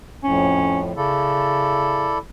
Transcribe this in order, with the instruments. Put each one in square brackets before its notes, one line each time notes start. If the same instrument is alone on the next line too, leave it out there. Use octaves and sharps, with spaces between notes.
[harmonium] F2 A2 [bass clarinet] C#4
[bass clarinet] C#3 [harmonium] E4 A4 D5